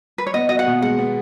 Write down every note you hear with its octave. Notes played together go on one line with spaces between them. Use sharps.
B4
C#5
B3 D#5
F#4 D#5
F#5
B2
G#3 F#5
B3